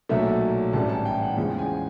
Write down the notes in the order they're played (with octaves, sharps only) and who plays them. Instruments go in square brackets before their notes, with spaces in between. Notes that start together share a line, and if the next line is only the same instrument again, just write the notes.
[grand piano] B1 A#2 F#3 A3 E5
A1 G#2 E3 G3 A5
A5
G5
F#5
E2 C#3 F3 G#3 G5
G#5